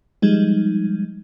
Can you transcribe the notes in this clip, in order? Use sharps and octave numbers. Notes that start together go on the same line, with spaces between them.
F3 G3 G#3 D#4